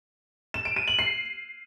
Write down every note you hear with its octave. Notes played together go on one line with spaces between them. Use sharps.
E7
D7
D#7
F#7
C7